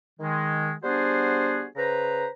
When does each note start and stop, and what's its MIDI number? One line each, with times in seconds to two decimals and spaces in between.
0.20 0.72 51
0.20 0.72 56
0.84 1.65 55
0.84 1.65 59
0.84 1.65 62
0.84 1.65 66
0.84 1.65 68
0.84 1.65 72
1.76 2.26 49
1.76 2.26 71
1.76 2.26 72
1.76 2.26 82